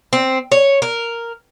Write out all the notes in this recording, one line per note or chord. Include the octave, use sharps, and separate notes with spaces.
C4
C#5
A#4